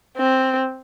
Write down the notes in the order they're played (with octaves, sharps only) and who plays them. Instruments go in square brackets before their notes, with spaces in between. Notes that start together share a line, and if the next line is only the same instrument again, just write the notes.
[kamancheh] C4